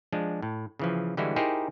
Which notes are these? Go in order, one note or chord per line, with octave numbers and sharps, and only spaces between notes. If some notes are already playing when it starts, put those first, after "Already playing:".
F3 G#3 D4
A2
C#3 E3 F3
D3 E3 G3 G#3 E4 F#4
D#4 E4 G4 G#4 A#4 C5